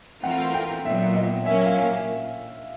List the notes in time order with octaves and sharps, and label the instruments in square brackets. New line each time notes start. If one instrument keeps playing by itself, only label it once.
[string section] E3 A3 C4 F4 A#4 [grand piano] F#5
[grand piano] G5
[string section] A#2 F#3 B3 [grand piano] E5
[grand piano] D#5
[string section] A#2 F#3 A#3 C#4 [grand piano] E5
[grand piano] F5